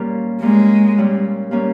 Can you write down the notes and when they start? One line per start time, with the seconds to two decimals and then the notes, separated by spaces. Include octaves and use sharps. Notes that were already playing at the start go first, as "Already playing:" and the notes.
Already playing: A#2 G3 A#3 C#4
0.42 A#2 G3 G#3 A#3 C#4
0.97 A#2 G3 A#3 C#4
1.51 A#2 G3 A#3 C#4